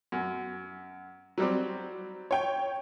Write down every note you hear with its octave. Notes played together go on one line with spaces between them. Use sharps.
F#2
F#3 G3 C4
C#5 G5